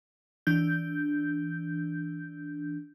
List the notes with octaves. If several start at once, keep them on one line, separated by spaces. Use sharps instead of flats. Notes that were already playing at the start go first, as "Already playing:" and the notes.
E3 D4 G6